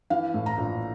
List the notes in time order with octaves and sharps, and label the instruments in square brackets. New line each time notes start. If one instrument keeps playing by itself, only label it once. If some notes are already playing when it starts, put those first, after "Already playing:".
[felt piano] E3 F5
A2
A#5
A#1